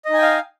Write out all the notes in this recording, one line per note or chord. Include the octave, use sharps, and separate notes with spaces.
D#4 D#5 F5 G5 G#5